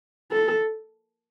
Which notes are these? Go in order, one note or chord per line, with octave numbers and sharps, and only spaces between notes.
A4